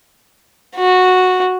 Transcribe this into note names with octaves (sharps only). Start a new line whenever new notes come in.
F#4